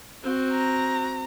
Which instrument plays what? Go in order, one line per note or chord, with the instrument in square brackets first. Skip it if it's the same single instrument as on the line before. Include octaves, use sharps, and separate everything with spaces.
[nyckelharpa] C4 F#4
[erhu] A#5